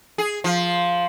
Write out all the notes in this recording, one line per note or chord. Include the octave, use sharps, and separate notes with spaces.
G#4
F3